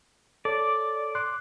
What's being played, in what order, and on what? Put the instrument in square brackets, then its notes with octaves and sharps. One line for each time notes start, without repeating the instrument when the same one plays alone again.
[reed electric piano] A4 C#5 [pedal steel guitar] D5
[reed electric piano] C6 D6 F#6